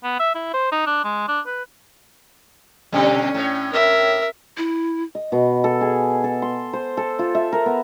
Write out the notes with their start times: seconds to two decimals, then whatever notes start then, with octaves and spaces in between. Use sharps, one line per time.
0.03 B3
0.20 E5
0.34 E4
0.54 C5
0.72 D#4
0.86 D4
1.04 G#3
1.28 D4
1.46 B4
2.93 B2 D3 G3 C#4
3.34 A2 C#5
3.73 A#4 E5
4.57 E4
5.15 D#5
5.32 B2
5.64 A4
5.81 G#4
6.24 A4
6.42 C6
6.73 C5
6.97 A4
7.19 F4
7.35 E5
7.52 A#4
7.66 B3